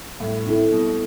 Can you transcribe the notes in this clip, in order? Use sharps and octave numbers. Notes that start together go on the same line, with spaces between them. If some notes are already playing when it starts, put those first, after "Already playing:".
A2 G3
C4 E4 A4
B2 G3